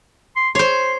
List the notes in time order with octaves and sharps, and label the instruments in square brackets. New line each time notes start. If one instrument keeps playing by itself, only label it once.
[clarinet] C6
[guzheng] C5 C#5 [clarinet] C6